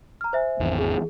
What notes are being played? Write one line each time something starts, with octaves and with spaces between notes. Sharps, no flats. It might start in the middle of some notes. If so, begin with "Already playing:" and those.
A#5 F6
C5 E5 G#5
G#1 E2 E3
G#4